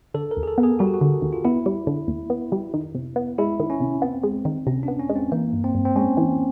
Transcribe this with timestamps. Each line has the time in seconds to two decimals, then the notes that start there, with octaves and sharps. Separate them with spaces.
0.14 D3 A4
0.31 A#4
0.37 D#2
0.43 G#4
0.48 A4
0.58 B3
0.63 G#4
0.79 G3 F#4
0.87 G4
0.94 F#4
1.01 D3
1.22 D#2
1.33 F4
1.45 B3 E4
1.66 G3
1.87 D3
2.08 D#2
2.30 B3
2.52 G3
2.74 D#3
2.95 C3
3.16 B3
3.38 G#3 E4
3.60 D#3
3.70 C#4
3.80 C3
4.02 B3 C4
4.23 G#3
4.45 D#3
4.67 C3 C#4
4.83 B3 D4
4.99 C#4
5.10 G#3
5.15 C4
5.32 E3 A#3
5.53 G2
5.64 C4
5.75 G2
5.85 C4
5.96 G#3 C#4
6.17 E3